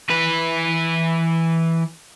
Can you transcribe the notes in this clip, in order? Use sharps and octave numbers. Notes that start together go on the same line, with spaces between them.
E3 B4